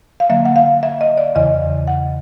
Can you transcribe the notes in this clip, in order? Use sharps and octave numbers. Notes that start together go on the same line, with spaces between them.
F5
D3 F#3 A#3 E5
F#5
F5
E5
D#5
D5
E2 C#3 E3 D#5
F#5